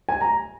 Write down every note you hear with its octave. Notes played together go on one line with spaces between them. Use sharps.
G#5
A#5